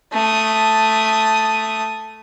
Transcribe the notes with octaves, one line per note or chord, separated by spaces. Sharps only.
A3 D#6